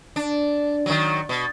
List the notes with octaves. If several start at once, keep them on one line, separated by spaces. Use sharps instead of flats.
D4
D#3 F#3
B2